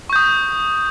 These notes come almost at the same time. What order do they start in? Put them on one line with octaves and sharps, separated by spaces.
C#6 G6 D#6